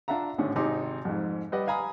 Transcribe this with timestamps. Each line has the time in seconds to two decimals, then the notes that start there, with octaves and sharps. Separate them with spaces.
0.08 D4 F4 E5 F#5 A#5
0.38 G#1 A2 D3 C#4
0.56 G#1 C3 D#4 C6 D6
1.05 F2 G#2
1.52 G3 B4 D5 D#5 F#5
1.67 F5 G#5 A#5 B5 D#6